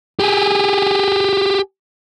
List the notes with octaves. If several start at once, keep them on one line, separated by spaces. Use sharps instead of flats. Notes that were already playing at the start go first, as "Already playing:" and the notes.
G4 G#4